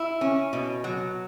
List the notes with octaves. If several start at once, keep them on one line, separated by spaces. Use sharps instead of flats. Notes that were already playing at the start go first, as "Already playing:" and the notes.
Already playing: E4
C#4
B2
F#3